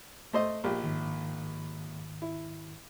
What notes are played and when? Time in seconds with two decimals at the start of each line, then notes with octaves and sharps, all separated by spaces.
0.33 A3 C5 D#5
0.64 A#1 G4
0.84 G#2 D#3
2.22 E4